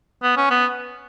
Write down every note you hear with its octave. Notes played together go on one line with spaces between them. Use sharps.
B3
C#4
B3